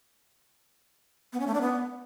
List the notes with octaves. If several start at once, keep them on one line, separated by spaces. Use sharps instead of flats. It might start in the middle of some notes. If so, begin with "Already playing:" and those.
B3
C#4
A3
D4
B3